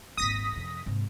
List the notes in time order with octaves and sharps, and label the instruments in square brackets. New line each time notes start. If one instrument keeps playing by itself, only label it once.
[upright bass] D#1 G#1 [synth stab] D#6 A#6 B6
[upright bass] F2 C3
G#2 C3